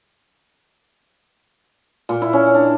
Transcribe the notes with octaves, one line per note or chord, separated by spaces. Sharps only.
A#2
E4
C#4
D4